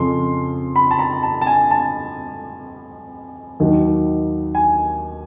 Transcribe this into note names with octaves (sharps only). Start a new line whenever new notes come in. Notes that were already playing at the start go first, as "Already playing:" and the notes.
Already playing: F2 C#3 F3 C6
B5
A5
A#5
A5
A5
G#5
A5
D#2 D#3 F#3
G#5